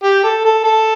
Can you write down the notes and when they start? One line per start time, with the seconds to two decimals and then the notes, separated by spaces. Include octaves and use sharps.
0.04 G4
0.24 A4
0.45 A4
0.64 A4